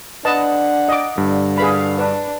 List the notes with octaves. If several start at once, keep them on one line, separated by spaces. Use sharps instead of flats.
D4 B4 D#5 F#5 A5
D#5 D6
G2 D3
G#4 B4 F5 B5
D4 B4